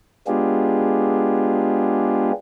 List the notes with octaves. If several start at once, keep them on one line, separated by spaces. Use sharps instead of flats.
G#3 B3 D4 F4 G4 G#4